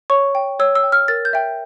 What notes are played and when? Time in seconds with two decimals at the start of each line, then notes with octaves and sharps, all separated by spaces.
0.10 C#5 C#6
0.35 G5
0.60 C#5 E6
0.75 E6
0.83 G5
0.92 F6
1.08 A#4 A6
1.25 G6
1.33 E5 G5